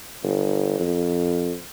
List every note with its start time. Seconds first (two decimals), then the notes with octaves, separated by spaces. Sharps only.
0.23 G1
0.79 F2